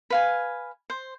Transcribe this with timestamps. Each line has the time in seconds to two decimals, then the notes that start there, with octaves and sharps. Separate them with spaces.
0.10 B4 F5 G#5
0.90 C5